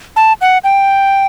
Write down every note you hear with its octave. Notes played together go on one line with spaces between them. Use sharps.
A5
F#5
G5